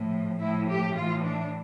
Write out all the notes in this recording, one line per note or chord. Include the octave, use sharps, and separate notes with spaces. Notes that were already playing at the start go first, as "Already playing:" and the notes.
Already playing: A2 F3
A2 F3 E4
G4
A2 E3 F4
D4